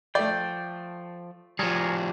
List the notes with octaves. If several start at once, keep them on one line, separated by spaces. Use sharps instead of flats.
F3 A3 D5 G5
F3 G3 G#4 A#4 C#5